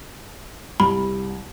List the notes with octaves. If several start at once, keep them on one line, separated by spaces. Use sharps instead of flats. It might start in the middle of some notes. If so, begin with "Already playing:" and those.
C2 B5